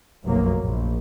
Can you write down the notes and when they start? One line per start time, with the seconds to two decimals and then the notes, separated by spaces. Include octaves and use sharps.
0.24 F1 B1 F#2 F#3 A#3
0.60 A#1